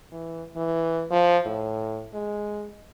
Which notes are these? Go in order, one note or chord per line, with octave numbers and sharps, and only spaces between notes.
E3
E3
F3
A2
G#3